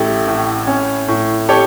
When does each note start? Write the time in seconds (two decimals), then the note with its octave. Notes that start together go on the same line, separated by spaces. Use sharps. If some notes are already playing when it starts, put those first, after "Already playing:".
Already playing: A1 A3 E4 G4
0.28 A2
0.67 C#4
1.08 A2
1.49 G4 A4 C#5